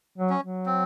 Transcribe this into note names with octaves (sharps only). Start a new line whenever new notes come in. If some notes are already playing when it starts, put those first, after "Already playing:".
F#3
C#4
F#3
C4